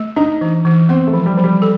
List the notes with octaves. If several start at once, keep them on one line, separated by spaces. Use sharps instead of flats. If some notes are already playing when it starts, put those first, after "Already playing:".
Already playing: A3
D4 D#4
E3
E3
B3 C4
A3
F3
G3
F3
G3
A4